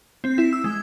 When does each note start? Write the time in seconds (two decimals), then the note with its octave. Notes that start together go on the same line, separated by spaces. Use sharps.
0.24 C4
0.38 E4
0.53 E6
0.64 G#3